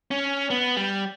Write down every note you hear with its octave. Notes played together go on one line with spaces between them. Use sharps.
C#4
B3
G3